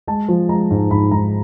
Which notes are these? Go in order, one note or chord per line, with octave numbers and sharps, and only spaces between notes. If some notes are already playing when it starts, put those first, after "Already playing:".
G#3 A5
F3
G#3 A#5
G#2
G#2 B5
G#2 A#5